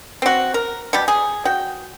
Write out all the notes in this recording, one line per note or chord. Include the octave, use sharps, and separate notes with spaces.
C4 F#4
A#4
B2 G3 G4
G#4
F#4 G5